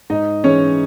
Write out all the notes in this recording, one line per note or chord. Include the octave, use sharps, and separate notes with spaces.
G#2 D#4 D#5
E3 G#3 C#4 C#5